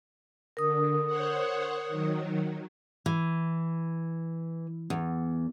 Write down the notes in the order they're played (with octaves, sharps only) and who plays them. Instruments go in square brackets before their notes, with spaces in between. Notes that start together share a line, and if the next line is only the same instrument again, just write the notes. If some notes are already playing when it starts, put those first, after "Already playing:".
[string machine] D3 [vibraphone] A#4 D#6
[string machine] C5 C#5 F#5
D#3 F#3
[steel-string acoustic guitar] E3
E2